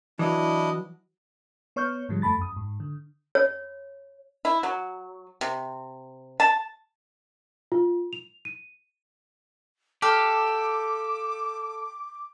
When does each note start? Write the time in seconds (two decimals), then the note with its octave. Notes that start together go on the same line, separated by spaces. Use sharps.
0.19 E3 F#3 D4 E4 D#5
1.76 B3 C#5 C#6 F6 G6
2.09 G#2 D3 F3 G3 G#3
2.22 F#2 A3 A5 B5 A6
2.39 F#2 D#6
2.56 G#2
2.80 D3
3.35 C#5
4.45 E4
4.63 F#3
5.41 C3
6.40 A5
7.72 F4
8.13 F7
8.45 D#7
10.02 G4 A4 F5 D6